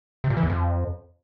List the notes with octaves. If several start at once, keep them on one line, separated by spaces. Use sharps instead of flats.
C3
A#2
E3
E2
F2